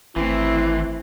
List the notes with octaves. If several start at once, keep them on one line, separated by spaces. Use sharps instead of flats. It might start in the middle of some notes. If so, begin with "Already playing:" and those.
G#1 E3 A3 C4 E4